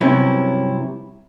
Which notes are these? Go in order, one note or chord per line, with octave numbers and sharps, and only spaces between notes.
G2 C3 F#3 B3 C#4 E4